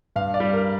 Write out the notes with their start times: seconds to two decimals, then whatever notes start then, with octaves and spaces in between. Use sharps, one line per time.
0.16 G2 F5
0.34 D5
0.40 G3
0.53 A#4